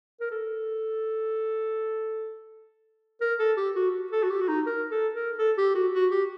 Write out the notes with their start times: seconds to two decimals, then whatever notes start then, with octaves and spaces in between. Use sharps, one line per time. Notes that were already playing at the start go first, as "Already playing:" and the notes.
0.20 A#4
0.31 A4
3.21 A#4
3.39 A4
3.57 G4
3.75 F#4
4.12 A4
4.23 F#4
4.30 G4
4.41 F#4
4.48 D#4
4.66 A#4
4.91 A4
5.14 A#4
5.38 A4
5.57 G4
5.75 F#4
5.93 F#4
6.11 G4